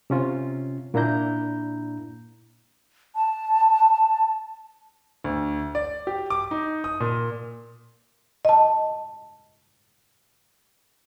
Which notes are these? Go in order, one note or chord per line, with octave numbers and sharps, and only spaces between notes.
C3 C#4 F4
A#2 A#3 D4 E4 A#5 G6
A5
D2
D5
G4
D6
D#4
D#6
A#2
D#5 A5